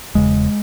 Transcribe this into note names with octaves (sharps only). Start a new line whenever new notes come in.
E1 E2 C#3 G#3